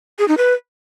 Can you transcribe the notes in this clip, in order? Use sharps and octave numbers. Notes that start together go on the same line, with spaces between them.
G#4
D#4
B4